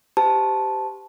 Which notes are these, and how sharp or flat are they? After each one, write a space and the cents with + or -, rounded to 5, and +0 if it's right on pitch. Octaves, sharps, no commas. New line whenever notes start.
G4 +0 C5 -35 A5 -5